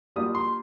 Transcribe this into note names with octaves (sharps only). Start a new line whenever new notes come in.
G3 A#3 D4 F4 D#6
C6